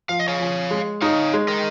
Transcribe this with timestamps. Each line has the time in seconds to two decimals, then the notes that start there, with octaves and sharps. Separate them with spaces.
0.09 F3 F5
0.19 D#5
0.28 C#5 F5
0.39 F3
0.71 G#3
1.02 D#4 C#5 F5
1.33 G#3
1.48 A#4 D#5